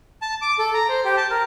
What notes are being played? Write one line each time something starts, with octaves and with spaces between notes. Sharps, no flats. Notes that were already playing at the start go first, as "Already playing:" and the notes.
A5
D6
A4
A#5
C5
G4
A5
A#4